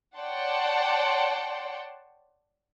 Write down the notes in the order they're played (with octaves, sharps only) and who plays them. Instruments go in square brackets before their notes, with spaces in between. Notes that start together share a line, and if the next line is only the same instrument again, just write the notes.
[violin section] C#5 D5 F#5 G5 A5 C6